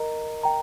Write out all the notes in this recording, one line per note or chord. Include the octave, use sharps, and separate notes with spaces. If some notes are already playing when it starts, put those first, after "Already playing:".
Already playing: A#4 D#5 A#5
G5 A#5